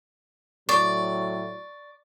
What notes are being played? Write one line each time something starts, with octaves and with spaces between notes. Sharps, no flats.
A2 F#3 D5 C#6